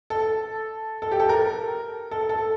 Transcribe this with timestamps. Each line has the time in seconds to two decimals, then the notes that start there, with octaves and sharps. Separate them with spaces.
0.10 A4
1.02 A4
1.11 G4
1.20 A4
1.29 A#4
2.11 A4
2.29 A4